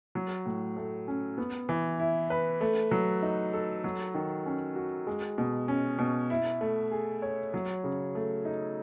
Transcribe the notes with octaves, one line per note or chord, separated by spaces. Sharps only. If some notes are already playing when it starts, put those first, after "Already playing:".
F#3
A2
A3
C#4
B3
E3
E4
B4
A3
F#3
D#4
A4
F#3
D#3
C#4
F#4
G#3
B2
C#4
B2
E4
A3
G#4
C#5
F#3
C#3
A3
D#4